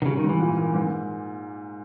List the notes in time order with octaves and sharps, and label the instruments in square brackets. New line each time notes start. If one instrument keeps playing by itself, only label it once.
[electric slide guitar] D#3
[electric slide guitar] C#3 [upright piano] G3
[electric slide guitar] D#3
[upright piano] G#2
[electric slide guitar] E3
[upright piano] A#2
A#3
G#2